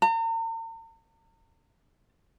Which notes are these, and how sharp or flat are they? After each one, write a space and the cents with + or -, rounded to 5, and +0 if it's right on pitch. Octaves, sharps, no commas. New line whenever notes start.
A#5 -45